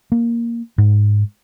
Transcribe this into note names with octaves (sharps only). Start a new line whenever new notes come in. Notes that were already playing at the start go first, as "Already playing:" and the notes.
A#3
G#2